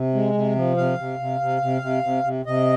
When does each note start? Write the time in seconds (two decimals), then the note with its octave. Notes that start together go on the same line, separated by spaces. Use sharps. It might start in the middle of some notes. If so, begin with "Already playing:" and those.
Already playing: C3
0.14 G#3
0.34 C3
0.55 F3
0.77 C3 F5
0.98 C3
1.20 C3
1.40 C3
1.62 C3
1.82 C3
2.03 C3
2.24 C3
2.46 C3 D#5